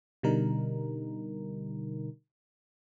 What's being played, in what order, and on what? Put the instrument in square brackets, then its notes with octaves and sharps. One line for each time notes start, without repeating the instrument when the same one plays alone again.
[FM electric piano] B2 D3 G3 D#4 A#4